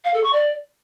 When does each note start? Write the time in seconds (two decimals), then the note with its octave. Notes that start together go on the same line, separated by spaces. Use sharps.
0.05 F5
0.14 A4
0.24 C#6
0.33 D5